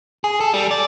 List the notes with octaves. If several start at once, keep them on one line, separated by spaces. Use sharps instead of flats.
G#4
A4
G3
D5